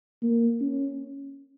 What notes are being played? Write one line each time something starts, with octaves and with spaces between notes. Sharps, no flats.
A#3
C#4